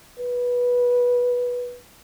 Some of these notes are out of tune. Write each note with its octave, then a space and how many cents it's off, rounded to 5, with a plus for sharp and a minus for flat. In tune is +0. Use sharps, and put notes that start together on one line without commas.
B4 -15